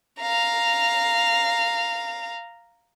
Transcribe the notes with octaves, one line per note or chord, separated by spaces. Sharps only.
F5 A#5